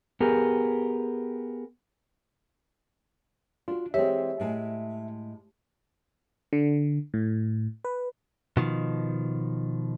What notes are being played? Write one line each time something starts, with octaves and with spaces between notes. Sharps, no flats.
B3 G4 G#4 A#4
D4 F4 F#4
E3 G#3 C4 G4 C#5 E5
A2 G#3 A5
D3
A2
B4
B2 D#3 F3